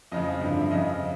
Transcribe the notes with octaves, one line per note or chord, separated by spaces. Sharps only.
F2 C#3 F3 D#5
G2 D3 F3
E5
F2 C#3 F3 D#5